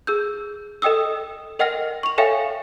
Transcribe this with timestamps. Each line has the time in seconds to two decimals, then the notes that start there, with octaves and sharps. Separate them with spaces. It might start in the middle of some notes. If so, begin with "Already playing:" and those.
0.07 G#4 E6 G6
0.82 A4 D#5 G5 D#6 E6
1.59 A#4 D#5 F#5 G5 F6 A#6
2.03 C#6 F7
2.18 A4 C#5 E5 F5 G5 G#5